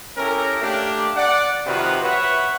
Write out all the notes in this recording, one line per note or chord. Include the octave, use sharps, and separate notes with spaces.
C#4 E4 G4 A4 A#4
A3 A#3 D4 G4
D5 F#5
C3 D#3 F3 F4 F#4 B4
B4 C#5 E5 F#5